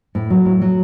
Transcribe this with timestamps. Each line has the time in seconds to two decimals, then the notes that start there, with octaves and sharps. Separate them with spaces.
0.15 A2
0.30 F#3
0.45 A2
0.61 F#3